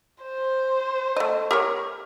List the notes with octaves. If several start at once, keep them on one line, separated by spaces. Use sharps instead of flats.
C5
A3 D#5
G4 A#4 C#5